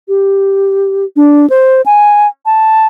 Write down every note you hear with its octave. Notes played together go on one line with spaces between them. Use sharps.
G4
D4
C5
G#5
A5